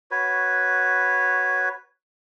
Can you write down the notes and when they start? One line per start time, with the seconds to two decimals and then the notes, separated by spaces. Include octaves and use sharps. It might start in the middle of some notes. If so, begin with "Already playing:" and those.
0.11 F#4 B4 C#5